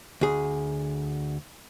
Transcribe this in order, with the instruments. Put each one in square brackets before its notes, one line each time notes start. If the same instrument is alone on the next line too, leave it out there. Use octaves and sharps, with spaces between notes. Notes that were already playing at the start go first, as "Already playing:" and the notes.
[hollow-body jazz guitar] D2 G#4